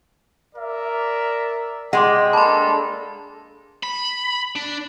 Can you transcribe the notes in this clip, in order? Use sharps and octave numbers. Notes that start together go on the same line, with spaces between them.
A#4 D5 E5
G#3 F#5 G5 C6 D6
A#3 D4 A4 A5 B5 C6 D6
B5
D4